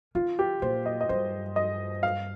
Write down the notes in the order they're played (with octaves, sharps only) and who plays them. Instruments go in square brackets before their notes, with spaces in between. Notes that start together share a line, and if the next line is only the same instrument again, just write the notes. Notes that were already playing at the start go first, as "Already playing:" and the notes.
[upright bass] D#3 [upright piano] F4
[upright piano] G4
[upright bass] A#2 [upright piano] C5
[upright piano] D#5
D#5
[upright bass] G2 [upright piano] C5
[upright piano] D#5
F5